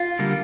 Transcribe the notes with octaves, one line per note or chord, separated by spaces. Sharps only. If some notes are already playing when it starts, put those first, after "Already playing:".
Already playing: F4
D3 G3 A#3